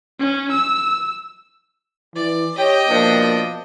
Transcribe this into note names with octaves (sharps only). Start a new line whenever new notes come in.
C#4
E6
E3 D5
G4 C#5 D#5 G5
B2 F3 A#3 D4